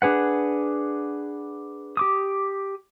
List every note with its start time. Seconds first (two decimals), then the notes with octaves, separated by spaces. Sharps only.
0.02 D4 G#4 B4 F#5
1.97 G4 D6 D#6